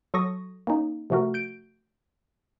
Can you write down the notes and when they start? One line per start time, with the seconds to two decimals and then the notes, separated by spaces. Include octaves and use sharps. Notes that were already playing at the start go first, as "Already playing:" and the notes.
0.14 F#3 A4 C#6 D#6 A#6
0.67 A#3 C#4 D#4
1.10 C3 F3 A3 F#4 A#4
1.34 G6 D7